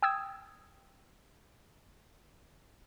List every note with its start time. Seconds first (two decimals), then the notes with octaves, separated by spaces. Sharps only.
0.03 G5 D#6 E6 G#6